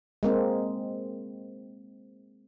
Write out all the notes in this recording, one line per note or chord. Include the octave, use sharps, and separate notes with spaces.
G#3 A#3 C4